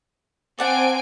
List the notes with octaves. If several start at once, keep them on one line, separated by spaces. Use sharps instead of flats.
C4 D5 F#5 G#5 A5 D7